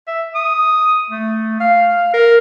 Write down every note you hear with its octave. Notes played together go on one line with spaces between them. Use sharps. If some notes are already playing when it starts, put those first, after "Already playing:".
E5
D#6
A3
F5
A#4